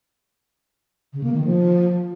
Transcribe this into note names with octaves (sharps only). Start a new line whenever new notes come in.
C#3
A#3
D#3
F3